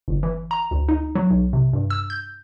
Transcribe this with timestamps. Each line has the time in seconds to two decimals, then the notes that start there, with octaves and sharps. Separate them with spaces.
0.08 G1
0.23 E3
0.51 A#5
0.71 D2
0.89 D#4
1.15 F#3
1.30 B1
1.53 C3
1.73 G2
1.90 E6
2.10 G6